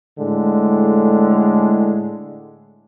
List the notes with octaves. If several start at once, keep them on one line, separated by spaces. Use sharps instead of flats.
A2 D3 G#3